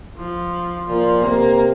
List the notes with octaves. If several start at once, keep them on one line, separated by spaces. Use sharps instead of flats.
F3
A#2 F3
C3 A#3